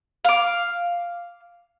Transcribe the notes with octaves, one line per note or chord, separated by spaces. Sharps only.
F5 D6